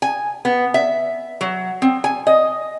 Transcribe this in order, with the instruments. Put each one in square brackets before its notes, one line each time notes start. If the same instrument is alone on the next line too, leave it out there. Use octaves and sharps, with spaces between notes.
[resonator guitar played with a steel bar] G#5
B3
E5
F#3
C4
G#5
D#5